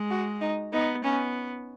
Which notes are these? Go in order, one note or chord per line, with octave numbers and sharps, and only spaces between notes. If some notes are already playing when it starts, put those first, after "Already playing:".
Already playing: G#3
F#4
D#4
B3 D#4
B3 C#4